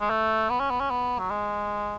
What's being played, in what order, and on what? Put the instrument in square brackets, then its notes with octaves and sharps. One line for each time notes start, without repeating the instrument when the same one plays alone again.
[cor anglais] G#3
A3
B3
C#4
B3
C#4
B3
F#3
G#3